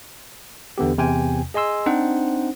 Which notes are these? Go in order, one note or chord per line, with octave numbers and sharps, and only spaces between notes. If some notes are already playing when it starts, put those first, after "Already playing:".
E2 D3 B3 G4
E2 C3 G5 G#5
G#4 D#5 G#5 C6 E6
C4 D4 D#4 C5 F#5